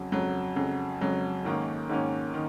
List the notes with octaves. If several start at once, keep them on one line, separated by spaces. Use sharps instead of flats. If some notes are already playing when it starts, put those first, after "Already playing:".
Already playing: F2 C#3 F#3
F2 C#3 F#3
F2 C#3 F#3
F2 C#3 F#3
G#2 D#3 A#3 C#4
G#2 D#3 A#3 C#4
D#3